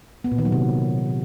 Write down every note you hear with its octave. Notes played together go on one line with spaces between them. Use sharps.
B3
A#2
D#3
F#3
C3